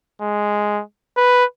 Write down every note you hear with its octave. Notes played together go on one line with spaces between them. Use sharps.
G#3
B4